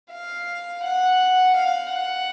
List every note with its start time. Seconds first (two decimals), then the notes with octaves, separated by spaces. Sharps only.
0.13 F5
0.85 F#5
1.57 F5
1.93 F#5